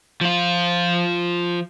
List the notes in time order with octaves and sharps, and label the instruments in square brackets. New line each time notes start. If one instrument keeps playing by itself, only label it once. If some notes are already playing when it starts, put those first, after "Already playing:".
[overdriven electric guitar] F3 F4